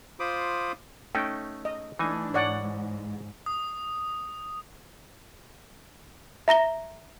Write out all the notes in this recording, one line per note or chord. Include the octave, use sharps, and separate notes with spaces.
F4 C5 B5 D6 D#6
A3 C#4 D#4 G5
D#5
E3 A3 D4 D#4 G#5
G#2 C#5 D5 F#5
D#6
E5 A#5 A#6 G7